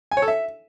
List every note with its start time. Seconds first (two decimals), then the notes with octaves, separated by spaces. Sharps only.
0.11 G#5
0.17 C#5
0.22 A4
0.28 E5